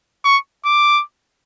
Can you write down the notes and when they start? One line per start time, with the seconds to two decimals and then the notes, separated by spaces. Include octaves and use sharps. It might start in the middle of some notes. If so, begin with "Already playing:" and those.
0.25 C#6
0.65 D6